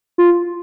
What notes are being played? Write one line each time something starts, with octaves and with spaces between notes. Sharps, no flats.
F4